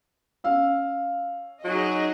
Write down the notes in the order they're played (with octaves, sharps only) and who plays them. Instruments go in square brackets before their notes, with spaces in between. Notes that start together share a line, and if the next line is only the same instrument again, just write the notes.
[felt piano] C#4 F5 E6
[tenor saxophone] F#3 [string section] D#4 G#4 D#5